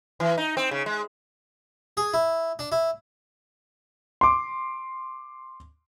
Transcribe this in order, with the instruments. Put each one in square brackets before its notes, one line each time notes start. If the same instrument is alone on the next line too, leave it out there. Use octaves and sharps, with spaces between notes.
[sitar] E3
D#4
C4
C#3
G#3
[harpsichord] G#4
E4
D4
E4
[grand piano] C6 D6